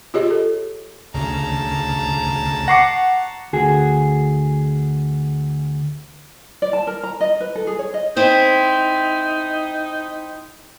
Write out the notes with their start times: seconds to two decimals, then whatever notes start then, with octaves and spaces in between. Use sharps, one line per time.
0.14 F4 G4 G#4 C#5 D#5
0.31 A4
1.14 D2 C#3 A5 A#5
2.68 F#5 C#6 D6 A#6 C7 C#7
3.53 D2 F#4 G#4
6.62 D5
6.73 A5
6.87 A#4
7.03 A#5
7.21 D#5
7.41 B4
7.55 A4
7.67 G#4
7.79 C#5
7.94 D#5
8.17 C4 D#4 E4